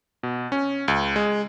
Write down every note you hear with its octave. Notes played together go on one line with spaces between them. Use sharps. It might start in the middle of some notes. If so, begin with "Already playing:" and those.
B2
C#4
C#2
G#3